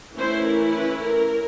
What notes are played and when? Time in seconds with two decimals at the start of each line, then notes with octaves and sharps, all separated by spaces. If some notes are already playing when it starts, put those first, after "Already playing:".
0.18 E3 A3 C#4 E4 C5
0.47 A#4
0.75 B4
1.04 A#4